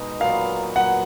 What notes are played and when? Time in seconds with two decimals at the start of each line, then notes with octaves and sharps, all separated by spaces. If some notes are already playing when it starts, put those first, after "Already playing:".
Already playing: B2 G#3 D#4 F#4
0.20 A#2 F#3 B3 F5
0.76 A#2 F#3 B3 F#5